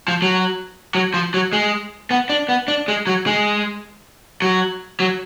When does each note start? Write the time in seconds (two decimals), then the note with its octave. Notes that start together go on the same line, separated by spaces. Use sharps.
0.08 F3
0.22 F#3
0.95 F#3
1.14 F3
1.34 F#3
1.53 G#3
2.11 B3
2.30 D4
2.49 B3
2.68 D4
2.88 G#3
3.07 F#3
3.26 G#3
4.42 F#3
5.00 F#3